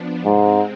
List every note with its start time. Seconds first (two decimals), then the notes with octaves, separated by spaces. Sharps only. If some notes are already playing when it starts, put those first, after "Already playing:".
Already playing: F3 B3 D4
0.25 G#2 C3 G#3 C4